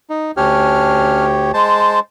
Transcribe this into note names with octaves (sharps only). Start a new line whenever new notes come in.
D#4
D2 C#4 D4 G4 C#5 F6
G#3 C5 A5